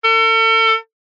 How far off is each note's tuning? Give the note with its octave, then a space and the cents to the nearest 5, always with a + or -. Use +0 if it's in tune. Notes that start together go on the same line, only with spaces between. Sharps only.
A4 +40